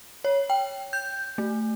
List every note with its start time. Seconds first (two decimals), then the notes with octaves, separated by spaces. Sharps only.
0.24 C#5
0.50 G5
0.93 G6
1.38 A3